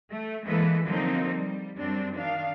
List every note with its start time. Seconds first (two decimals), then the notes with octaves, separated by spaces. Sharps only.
0.12 A3
0.44 E3 G#3 A#3 A4 B4
0.84 D3 F3 F#3 A#3 C4 D#4
1.35 G3
1.78 F#2 G3 C4 D4
2.16 D#3 D4 F5